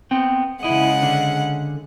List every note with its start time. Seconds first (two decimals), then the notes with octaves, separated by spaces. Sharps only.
0.11 B3 C4 G5
0.63 C#3 G#3 E4 D#5 F#5
1.03 D3 D4